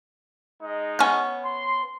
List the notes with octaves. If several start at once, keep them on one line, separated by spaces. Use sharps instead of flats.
G#3 D#4
B3 C#4 G#5 F6
C6